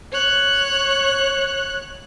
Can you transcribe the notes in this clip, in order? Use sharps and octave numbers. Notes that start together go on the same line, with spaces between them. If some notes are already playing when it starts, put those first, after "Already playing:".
C#5 F#6